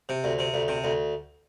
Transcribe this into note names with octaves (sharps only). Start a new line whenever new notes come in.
C3
D2
C3
D2
C3
D2